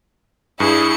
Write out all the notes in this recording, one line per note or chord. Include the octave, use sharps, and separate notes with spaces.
G2 E4 G#4 C#7